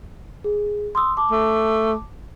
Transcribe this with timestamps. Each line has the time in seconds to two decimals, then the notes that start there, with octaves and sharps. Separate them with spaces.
0.44 G#4
0.95 C6 D#6 E6
1.17 A5 D6
1.31 A3